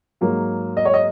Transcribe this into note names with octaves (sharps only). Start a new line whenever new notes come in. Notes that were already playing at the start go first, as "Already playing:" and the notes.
G#2 F#3 A#3
D#5
C#5
D#5